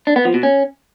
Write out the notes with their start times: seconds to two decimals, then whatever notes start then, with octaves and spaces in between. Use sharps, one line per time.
0.07 D4
0.16 B3
0.25 F3
0.34 B2
0.43 C#4